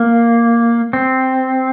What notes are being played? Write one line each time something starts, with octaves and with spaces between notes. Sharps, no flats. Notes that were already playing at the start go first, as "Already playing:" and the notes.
Already playing: A#3
C4